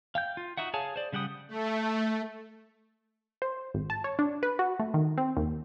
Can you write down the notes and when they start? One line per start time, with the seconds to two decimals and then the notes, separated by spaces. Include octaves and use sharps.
0.15 F5 G5 G6
0.37 F4
0.57 D#4 F#4 E5 F#5
0.74 G#4 C#5 F5 G#5 A5
0.96 C5 D5
1.12 C#3 G3 F#5 G5 D#6
1.48 A3
3.42 C5
3.74 G#1
3.90 A5
4.04 C#5
4.19 D4
4.43 B4
4.59 F#4
4.79 A3
4.94 D#3
5.18 C4
5.37 D#2